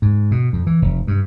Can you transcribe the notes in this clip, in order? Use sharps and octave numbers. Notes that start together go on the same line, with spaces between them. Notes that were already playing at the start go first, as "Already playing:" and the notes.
G#2
B2
F2
E3
F1
G2